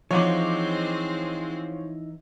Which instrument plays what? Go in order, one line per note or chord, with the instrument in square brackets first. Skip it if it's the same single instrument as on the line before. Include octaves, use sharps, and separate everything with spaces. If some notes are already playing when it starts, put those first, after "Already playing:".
[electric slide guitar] E3 D#4 [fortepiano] F3 [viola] G#3 C4 [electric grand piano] C#5 F#5 D6